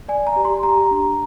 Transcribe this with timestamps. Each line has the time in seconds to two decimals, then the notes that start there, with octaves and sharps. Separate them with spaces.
0.08 D5 G#5
0.27 A#5
0.36 G4
0.45 C6
0.63 G4 A#5
0.91 D4